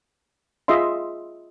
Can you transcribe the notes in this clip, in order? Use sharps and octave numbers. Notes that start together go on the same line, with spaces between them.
F4 G#4 D#5 E5 C6